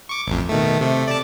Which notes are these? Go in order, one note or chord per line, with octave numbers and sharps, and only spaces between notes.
C#6 D6
A1 F2
B2 D#3 A3
C3 A3
D5 A5